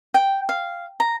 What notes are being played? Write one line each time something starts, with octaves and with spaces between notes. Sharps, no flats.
G5
F5
A#5